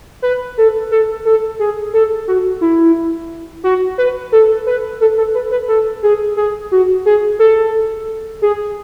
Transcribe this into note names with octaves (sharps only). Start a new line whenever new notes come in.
B4
A4
A4
A4
G#4
A4
F#4
E4
F#4
B4
A4
B4
A4
A4
B4
B4
A4
G#4
G#4
F#4
G#4
A4
G#4